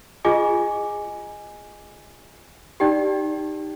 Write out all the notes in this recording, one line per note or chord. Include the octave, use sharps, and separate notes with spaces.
F4 G#4 D#5 G#5 D6
D#4 G4 D5 G5